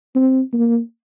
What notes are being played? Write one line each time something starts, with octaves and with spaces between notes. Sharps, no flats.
C4
A#3